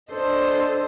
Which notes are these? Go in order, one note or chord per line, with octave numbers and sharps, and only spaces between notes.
D4 A4 C5 D#5